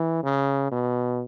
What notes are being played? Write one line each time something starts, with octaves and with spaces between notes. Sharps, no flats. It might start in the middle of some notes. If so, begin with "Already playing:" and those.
Already playing: E3
C#3
B2